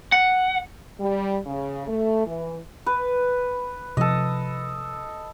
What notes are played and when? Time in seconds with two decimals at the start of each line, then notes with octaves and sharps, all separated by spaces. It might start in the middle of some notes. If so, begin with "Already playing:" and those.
0.12 F#5
1.00 G3
1.46 C#3
1.87 A3
2.26 E3
2.86 B4
3.97 C3 F3 A4 D#5